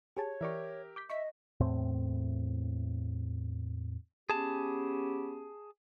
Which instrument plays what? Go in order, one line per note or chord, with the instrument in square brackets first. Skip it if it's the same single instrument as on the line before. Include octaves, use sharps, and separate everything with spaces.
[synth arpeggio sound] G4 G#4 A5 [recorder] C#5
[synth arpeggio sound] E3 D5 C#6 [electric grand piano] G4 A#4 E5
[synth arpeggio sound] D6 G6 B6
[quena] D#5 [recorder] E5 [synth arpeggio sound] C#6 B6
[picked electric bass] E2 A2 C4
[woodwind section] B3 C#4 G4 [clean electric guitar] G#4 A5